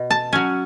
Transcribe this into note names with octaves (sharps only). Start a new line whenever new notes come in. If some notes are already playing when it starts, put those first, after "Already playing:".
Already playing: B2
A5
F#3 C#4 G#5